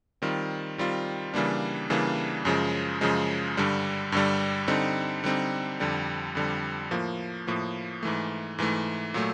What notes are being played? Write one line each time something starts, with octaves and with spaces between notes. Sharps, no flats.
D#3 G3 C4 F4
D#3 G3 C4 F4
C#3 E3 G3 A#3 D4
C#3 E3 G3 A#3 D4
F#2 C#3 F3 G#3
F#2 C#3 F3 G#3
G2 D3 G3
G2 D3 G3
D3 G3 C4 D#4
D3 G3 C4 D#4
F2 D3 G3
F2 D3 G3
A2 F3 A#3
A2 F3 A#3
G#2 E3 A3
G#2 E3 A3
A#2 F#3 A3